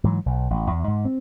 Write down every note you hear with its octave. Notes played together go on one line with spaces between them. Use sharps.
G#2 E3 F#3
B1
A1
E2
G#2
C4